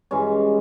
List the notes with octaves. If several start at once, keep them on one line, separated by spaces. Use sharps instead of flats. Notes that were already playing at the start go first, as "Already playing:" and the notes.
G2 E3 G#3 C#4